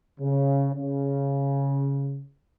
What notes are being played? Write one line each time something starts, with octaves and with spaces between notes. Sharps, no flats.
C#3
C#3